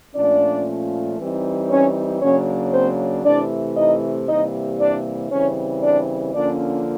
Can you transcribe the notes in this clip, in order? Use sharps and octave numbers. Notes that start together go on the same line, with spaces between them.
A#2 F3 A3 C#4 D4 D5
E3 G3 C4 D#4
C#4 C#5
C#3 F#3 A#3 C#4 D4 C#5
C4 C5
C3 E3 A3 D4 D5
D#4 D#5
C3 E3 G3 A#3 D#4 D#5
D4 D5
C#3 E3 G3 C4 C#4 C#5
D4 D5
D3 F3 A#3 C#4 D4 D5